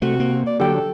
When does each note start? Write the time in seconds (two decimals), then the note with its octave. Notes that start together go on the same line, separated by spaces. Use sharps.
0.02 C3 A3 F#4
0.20 A#3
0.46 D5
0.60 D3 F#3 G4 A4 G5